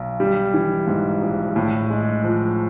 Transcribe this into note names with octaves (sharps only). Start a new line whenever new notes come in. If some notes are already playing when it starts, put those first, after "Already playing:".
Already playing: B1
G3
E3
G#2
A#1
A2
G#3
F3